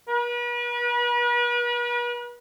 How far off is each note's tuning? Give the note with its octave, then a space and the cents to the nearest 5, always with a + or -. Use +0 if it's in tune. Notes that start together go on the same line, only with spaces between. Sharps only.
B4 -40